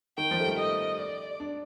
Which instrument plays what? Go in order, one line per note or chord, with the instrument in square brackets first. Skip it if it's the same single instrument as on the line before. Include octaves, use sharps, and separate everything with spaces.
[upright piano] D#3 [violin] G5
[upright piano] F3
A3
G3
[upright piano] A3 [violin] D#5
[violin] D5
[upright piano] D4